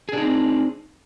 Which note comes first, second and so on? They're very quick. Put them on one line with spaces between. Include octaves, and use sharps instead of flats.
G#4 D4 D#4 C4